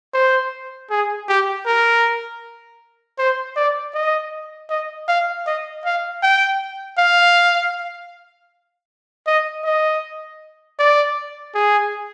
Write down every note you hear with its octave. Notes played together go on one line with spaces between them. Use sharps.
C5
G#4
G4
A#4
C5
D5
D#5
D#5
F5
D#5
F5
G5
F5
D#5
D#5
D5
G#4